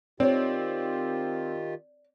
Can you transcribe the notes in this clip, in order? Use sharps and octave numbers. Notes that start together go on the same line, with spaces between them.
D#3 C4 F4 G4 C#5 D5